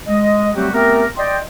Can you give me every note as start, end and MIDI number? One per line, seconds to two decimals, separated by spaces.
0.07 0.50 56
0.07 0.50 75
0.55 0.68 54
0.55 0.68 55
0.55 0.68 57
0.55 0.68 60
0.55 0.68 66
0.55 0.68 67
0.73 1.05 57
0.73 1.05 59
0.73 1.05 60
0.73 1.05 67
0.73 1.05 70
1.17 1.37 74
1.17 1.37 75
1.17 1.37 79
1.17 1.37 84